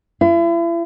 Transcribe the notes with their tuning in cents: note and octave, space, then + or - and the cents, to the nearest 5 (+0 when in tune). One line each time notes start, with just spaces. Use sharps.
E4 +40